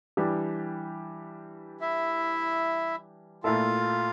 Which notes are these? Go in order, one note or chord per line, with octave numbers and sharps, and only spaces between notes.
E3 G3 D4 G4
E4 E5
A#2 A3 E4 F4 A4 F5